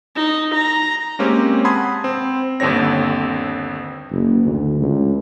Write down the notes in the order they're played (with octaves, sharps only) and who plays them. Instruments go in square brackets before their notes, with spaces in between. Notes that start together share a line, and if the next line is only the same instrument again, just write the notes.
[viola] D#4
A#5
[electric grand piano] G#3 A#3 C4 C#4 G4
F#5 A5 B5 C6 D#6 G#6
C4
G1 D#2 D3 C4 C#5 A#6
[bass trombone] F#1
D2
C#2